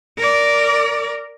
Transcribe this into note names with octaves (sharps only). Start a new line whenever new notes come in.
A#4 D5